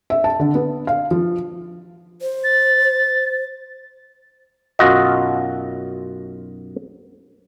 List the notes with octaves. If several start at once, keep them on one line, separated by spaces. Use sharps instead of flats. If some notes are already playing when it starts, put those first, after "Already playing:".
E5
A5
D3
B3
F5
F3
C5
A6
B1 F#2 F4 F#4 D#5